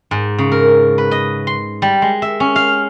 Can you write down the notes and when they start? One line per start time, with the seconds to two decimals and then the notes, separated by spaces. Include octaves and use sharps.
0.11 G#2
0.38 C#3
0.52 A#4
0.98 B4
1.11 D#5
1.47 C6
1.82 G3
2.02 G#3
2.22 E5
2.40 C#4
2.56 F5